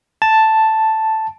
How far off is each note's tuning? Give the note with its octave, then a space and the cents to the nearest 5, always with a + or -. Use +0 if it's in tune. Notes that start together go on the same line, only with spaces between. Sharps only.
A5 +0